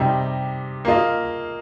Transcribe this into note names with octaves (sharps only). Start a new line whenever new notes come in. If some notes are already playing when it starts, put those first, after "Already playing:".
Already playing: C3 G3 D#4
A#3 F4 D#5